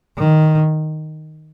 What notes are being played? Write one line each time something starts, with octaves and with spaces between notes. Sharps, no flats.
D#3